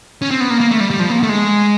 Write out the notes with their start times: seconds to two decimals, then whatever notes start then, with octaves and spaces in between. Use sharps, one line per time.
0.22 C#4
0.31 C4
0.40 B3
0.50 A#3
0.60 A#3
0.71 A3
0.80 G3
0.90 G3
1.00 F3
1.10 A#3
1.23 A3
1.29 G#3